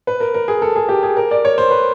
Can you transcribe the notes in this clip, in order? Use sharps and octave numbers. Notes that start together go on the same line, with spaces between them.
B4
A#4
A#4
G#4
A4
G#4
G4
G#4
A#4
D5
C#5
C5
B4